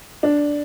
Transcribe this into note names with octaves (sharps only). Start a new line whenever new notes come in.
D4